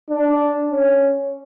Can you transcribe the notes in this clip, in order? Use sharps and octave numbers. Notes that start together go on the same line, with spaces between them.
D4
C#4